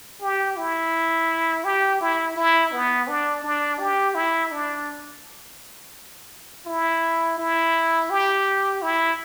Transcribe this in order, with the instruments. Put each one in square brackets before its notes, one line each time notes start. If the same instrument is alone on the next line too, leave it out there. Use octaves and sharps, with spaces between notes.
[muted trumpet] G4
E4
G4
E4
E4
B3
D4
D4
G4
E4
D4
E4
E4
G4
E4